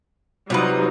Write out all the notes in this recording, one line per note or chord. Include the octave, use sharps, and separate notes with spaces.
C3 F#3 G3 D#4 F4 B4